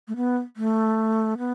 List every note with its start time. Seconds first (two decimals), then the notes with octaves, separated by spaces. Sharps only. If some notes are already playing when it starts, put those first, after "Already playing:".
0.08 A3
0.16 B3
0.57 A3
1.38 B3